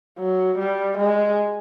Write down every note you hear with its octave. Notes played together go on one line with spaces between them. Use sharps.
F#3
G3
G#3